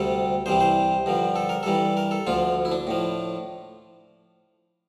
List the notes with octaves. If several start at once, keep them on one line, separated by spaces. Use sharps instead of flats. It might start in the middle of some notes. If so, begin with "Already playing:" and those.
Already playing: D2 C3 G3 A4
C2 C3 E3 G3 C5
C5
G2 D3 F3
A4
A#4
G2 E3 G3 A4
A#4
A4
D2 D3 F3 F4
E4
D4
A2 F3